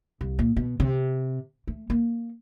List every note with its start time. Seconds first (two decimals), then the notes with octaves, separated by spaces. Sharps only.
0.21 C2
0.39 A#2
0.56 B2
0.80 C3
1.67 A3
1.90 A#3